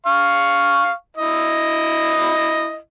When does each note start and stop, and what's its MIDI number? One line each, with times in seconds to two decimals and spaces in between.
0.06 0.92 77
0.06 0.92 85
1.17 2.77 64
1.17 2.77 75